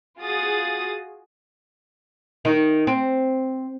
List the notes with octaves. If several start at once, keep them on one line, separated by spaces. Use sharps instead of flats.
F4 F#4 G#4 D#6 A6
D#3
C4